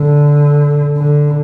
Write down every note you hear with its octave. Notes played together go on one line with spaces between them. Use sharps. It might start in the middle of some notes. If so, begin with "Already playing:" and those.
Already playing: D3
D3